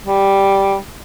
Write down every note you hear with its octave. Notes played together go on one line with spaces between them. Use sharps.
G3